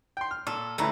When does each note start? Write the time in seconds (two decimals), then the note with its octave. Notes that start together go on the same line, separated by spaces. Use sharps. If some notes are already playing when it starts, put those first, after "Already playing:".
0.17 G5 C6
0.31 F6
0.47 A#2 A4
0.78 D2 C#3 E4 A4 B4 A#5